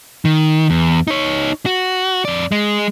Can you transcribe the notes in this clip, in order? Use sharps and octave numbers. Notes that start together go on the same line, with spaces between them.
D#3
E2
D#4 C#5
F#4
F2 D5
G#3